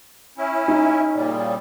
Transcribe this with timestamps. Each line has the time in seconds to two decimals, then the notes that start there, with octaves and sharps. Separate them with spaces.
0.38 C#4 E4
0.68 D#4
1.15 A#2 C#3 G3